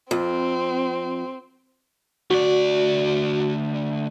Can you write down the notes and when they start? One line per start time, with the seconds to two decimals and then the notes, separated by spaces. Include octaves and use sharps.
0.11 F2 C4
2.30 D2 F#4 D5